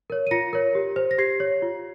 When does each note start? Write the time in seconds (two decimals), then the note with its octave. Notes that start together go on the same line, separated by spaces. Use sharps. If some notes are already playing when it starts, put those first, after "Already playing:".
0.10 A#4 C#5
0.27 D#7
0.31 F4 A#6 C#7
0.53 A#4 C#5
0.75 G4
0.96 C5
1.11 A#6
1.18 G4 G#6 C7
1.40 C#5
1.62 F4